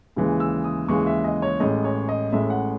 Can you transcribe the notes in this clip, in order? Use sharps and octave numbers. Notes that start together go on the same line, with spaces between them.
D#2 C#3 E3 G#3
E6
D#6
D#2 C#3 E3 G#3 C#6
E5
D#5
C#5
A1 A2 G#3 D#5
C#5
D#5
A1 A2 G#3 E5
F#5